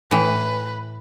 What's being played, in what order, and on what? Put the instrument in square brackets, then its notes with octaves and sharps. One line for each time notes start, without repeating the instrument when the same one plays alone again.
[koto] A2 E3 [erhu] B4